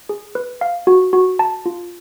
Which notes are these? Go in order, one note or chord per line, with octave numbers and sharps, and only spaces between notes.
G#4
B4
F5
F#4
F#4
A5
F4